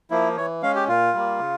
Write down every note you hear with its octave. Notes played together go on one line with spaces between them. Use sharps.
F3 A#3 E4
E3 C#5
G#3 C#4 F5
G4
A#2 F4
G3 A#3
C#3